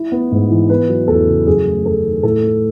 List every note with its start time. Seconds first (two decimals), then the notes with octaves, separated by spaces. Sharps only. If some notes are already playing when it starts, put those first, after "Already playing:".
Already playing: E4
0.12 B3
0.32 G#2
0.50 E3
0.69 B3 B4
0.88 F#3
1.08 E2 A4
1.27 C#3
1.46 F#2 G#4
1.67 A3
1.85 F#2 A4
2.05 D#3
2.23 A2 A4
2.43 A3